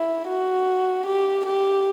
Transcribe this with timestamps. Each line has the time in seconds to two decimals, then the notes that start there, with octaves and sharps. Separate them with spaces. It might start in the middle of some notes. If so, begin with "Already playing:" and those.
Already playing: E4
0.28 F#4
1.06 G4
1.46 G4